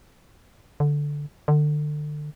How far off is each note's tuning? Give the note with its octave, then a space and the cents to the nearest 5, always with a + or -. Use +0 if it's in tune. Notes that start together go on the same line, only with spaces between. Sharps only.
D3 -5
D3 +30